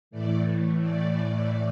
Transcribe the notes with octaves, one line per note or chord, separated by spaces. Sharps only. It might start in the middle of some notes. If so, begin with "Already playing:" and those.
A2 E3 A3 D5
D5